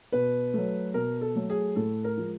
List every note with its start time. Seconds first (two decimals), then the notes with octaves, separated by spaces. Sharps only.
0.12 B2 B4
0.54 F#3 A3
0.94 B2 A#4
1.21 A4
1.36 F#3 A3
1.50 G#4
1.76 A2 A4
2.04 A#4
2.17 F3 G#3